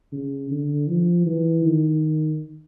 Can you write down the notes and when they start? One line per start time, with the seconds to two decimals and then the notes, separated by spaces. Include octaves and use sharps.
0.12 C#3
0.51 D3
0.88 F3
1.26 E3
1.64 D#3